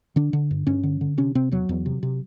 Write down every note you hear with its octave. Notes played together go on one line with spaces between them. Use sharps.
D3 D4
D3
G2
G2 C#4
D3
D3
C3 C#4
C3 C4
E2 F#3
E2
C3
C3